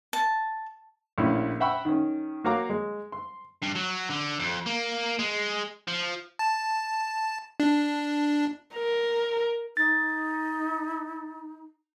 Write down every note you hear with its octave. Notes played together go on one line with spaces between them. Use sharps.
A5
A#1 A2 C#4 E4
E5 F#5 G5 B5 C#6 E6
D#3 C#4
A#3 F#4 C#5 F5 A#5 D6
G#3
C6
G2
F#3
D3
F2
A#3
G#3
F3
A5
D4
A#4
D#4 A6